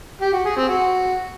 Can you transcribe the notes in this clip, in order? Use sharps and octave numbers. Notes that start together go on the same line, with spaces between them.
G4
F#4
G#4
C4
F#4